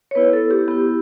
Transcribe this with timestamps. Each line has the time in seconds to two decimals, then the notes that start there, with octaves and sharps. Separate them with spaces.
0.11 C#5
0.15 B3 E4 B4
0.33 A4
0.51 G4
0.68 B3 E4 G4